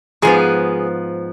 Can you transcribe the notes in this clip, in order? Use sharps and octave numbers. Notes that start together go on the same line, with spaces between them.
G#2 F3 B3 G#4